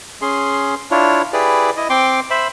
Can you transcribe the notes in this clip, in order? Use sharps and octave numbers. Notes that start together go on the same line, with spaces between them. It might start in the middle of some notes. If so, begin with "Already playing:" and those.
C#4 G#4 C6
D4 E4 F4 C#5
E4 G4 G#4 B4 D5
E4 D#5
C4 G5 C6 D6
C5 E5 B5